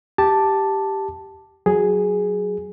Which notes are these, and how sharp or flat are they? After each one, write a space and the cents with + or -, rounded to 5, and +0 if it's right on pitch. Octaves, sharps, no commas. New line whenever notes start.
G4 +0 A5 +0 D6 +5
F#3 +0 G#4 +0